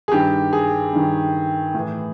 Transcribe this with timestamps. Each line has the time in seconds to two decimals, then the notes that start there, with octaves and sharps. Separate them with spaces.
0.08 G#4
0.12 G2 D#3 G4
0.53 G#4
0.93 G2 D#3
1.75 A2 E3